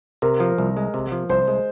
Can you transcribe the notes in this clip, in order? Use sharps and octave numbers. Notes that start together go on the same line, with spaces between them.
C3 A#4
F3
C2
G#3
C3
F3
C2 C5
G#3